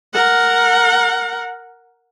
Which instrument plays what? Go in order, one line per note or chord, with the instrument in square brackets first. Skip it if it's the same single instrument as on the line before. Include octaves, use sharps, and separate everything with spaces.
[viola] A#4 F#5